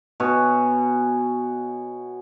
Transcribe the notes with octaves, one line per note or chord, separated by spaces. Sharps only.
B2 C#5 G#5